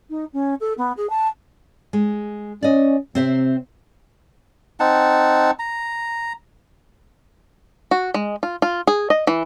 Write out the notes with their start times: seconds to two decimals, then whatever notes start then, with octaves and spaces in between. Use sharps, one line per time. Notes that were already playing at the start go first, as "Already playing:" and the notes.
0.09 D#4
0.33 C#4
0.60 A4
0.77 B3
0.96 G#4
1.09 A5
1.93 G#3
2.62 C#4 D5 D#5
3.15 C3 C4 C5 E5
4.80 C4 D#4 F#5 A5
5.59 A#5
7.91 F#4
8.14 G#3
8.43 F4
8.62 F4
8.87 G#4
9.10 D#5
9.27 E3